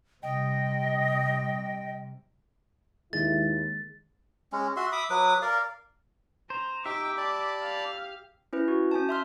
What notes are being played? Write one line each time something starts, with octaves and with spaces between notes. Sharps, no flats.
C3 G3 D#5 G5
D#2 G#2 D#3 G#3 D#4 E4 A6
G#3 C#4
F#4 E5 C6
E5 B5 D6 D#6
F#3 B4 D6 D#6
A#4 D5 F5
C5 A#5
D#4 G4 E5 G5 D6
D5 A5 B5
F5
C#4 E4 B4
F#4
C#4 G#5 A5
E5 C6 F6